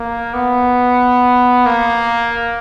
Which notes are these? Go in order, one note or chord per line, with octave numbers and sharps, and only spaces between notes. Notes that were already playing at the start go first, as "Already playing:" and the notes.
Already playing: A#3
B3
A#3